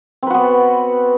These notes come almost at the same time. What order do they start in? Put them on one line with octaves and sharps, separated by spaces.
C4 B4 F#4 B3